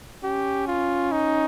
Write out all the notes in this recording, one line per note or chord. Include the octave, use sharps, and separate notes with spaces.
C#4 G4
F4
D#4